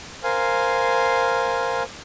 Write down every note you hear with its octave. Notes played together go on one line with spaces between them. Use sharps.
A#4 C5 F5 G#5